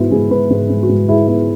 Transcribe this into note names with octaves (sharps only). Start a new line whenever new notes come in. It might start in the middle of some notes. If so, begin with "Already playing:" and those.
Already playing: G#2 G#3 B3 E4 F#4
G#2 G#4
G#2 B4
G#2
G#2
F#4
G#2
G#3 E4
B3 E4